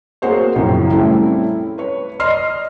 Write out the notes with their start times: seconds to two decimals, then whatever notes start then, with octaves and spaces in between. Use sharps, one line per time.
0.22 A#3 F#4 G#4 C5 C#5
0.55 A#1 F#2 C#3 E3
0.90 G3 A3 C4 C#4 E4
1.78 B4 C#5
2.19 D5 D#5 C6 F6 C7